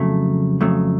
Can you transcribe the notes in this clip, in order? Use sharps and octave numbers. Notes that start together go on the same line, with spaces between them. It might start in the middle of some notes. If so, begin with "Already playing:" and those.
Already playing: F2 C#3 F#3 A3
F2 C#3 F#3 A3